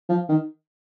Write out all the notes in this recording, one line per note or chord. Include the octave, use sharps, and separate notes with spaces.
F3
D#3